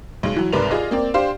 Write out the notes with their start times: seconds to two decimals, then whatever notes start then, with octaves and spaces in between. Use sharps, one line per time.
0.23 B1 G#3
0.36 E3 F#3
0.53 C2 G#2 A#4 B4 D5 F7
0.71 F4 G#4 D5 D#5
0.91 A#3 C4 D5
1.14 D4 G4 C5 F5